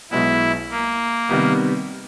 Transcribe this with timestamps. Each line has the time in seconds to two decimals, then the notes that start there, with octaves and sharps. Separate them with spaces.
0.11 B1 B2 G#3 B3 E4
0.71 A#3
1.29 C3 D#3 G3 B3